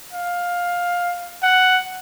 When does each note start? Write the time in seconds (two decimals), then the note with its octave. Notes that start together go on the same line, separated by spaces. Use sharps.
0.13 F5
1.43 F#5